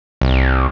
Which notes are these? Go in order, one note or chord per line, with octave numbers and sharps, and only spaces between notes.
C2